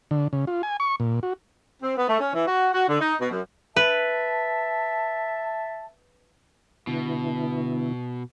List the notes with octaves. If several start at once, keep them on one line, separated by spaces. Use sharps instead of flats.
D3
C#3
F4
G#5
C#6
A#2
F#4
C4
B3
A3
C#4
E3
F#4
F#4
D3
D#4
B2
F#2
B4 E5 A5
B2 D3 B3 E4